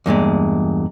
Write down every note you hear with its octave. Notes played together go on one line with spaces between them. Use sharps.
E2 G2 A#2 G#3